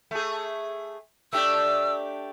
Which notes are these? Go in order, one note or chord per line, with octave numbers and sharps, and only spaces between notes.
A3 G#4
A3 D4 G4 E6